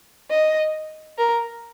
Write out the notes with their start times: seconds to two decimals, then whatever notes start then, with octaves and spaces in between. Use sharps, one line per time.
0.31 D#5
1.18 A#4